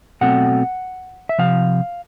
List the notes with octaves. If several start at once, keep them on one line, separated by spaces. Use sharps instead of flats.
B2 F#3 A3 C4 F#5
E5
C3 F3 F5